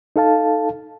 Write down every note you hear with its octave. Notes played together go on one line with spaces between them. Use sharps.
D#4 A4 F5 A5